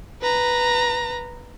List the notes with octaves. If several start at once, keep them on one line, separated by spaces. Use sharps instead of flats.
B4 A#5